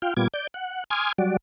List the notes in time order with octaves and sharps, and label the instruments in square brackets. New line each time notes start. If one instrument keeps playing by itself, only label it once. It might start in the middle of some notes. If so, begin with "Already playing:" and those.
[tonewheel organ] F4 F5 G5
A#2 G3 B3 F4 D6 G#6
D5 G6
F#5
G#5 C6 D6 D#6 F6 G#6
F#3 G3 F#4 D5